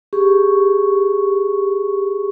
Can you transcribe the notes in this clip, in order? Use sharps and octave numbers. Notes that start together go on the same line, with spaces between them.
G4 G#4 C#6